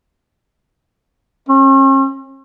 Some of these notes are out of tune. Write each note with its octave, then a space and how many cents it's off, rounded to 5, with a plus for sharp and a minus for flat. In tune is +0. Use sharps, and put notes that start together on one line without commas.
C#4 -40